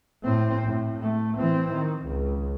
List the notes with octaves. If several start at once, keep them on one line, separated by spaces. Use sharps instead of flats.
A2 C4
A2
A3
E3 C4
D#3
C#2